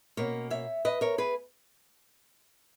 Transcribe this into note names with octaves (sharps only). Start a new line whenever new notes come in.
B2 A#3 C#4 A#4 C#5
C#5 E5
B4 D#5
A#4 C#5
G#4 B4